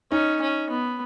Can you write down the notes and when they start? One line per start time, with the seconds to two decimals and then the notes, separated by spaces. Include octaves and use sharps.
0.12 C#4 D#4
0.41 C#4
0.70 B3